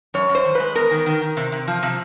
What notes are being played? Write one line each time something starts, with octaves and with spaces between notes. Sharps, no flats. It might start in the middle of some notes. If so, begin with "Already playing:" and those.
F#2 C#5
F#2
C5
D#3
G#3 B4
B3 A#4
D#3
D#3
D#3
C3
C3
F3
C3